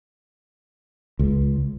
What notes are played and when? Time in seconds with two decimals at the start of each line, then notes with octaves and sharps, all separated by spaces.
1.19 C#2